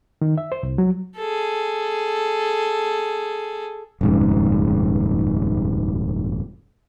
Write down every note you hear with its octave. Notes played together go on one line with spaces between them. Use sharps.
D#3
E5
C5
C2
F#3
G#4 A4
D#1 F2 G#2 C#3